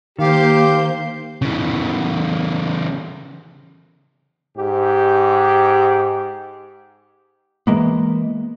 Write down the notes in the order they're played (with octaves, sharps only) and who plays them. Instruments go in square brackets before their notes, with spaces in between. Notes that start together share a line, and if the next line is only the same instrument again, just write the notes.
[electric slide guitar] D#3 [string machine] A#3 C5 G6 [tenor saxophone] G4 [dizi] F5
[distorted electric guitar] C#3 E3
[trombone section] G#2 G4
[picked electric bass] E3 G#3 A#3 B3